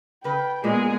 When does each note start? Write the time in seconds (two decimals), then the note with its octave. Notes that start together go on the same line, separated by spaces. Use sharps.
0.24 C#3 B4 G5
0.64 A#2 G#3 B3 G#4 D#5